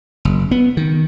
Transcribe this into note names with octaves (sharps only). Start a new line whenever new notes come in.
F#1
B3
D#3